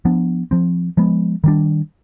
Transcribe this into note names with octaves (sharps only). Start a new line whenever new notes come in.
F3 B3 D4
F3 C4
F3 G#3 B3
D#3 G3 D4